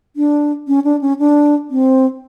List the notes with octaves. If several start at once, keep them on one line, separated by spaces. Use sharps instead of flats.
D4
C#4
D4
C#4
D4
C4